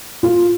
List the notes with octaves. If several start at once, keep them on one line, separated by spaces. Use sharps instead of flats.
F4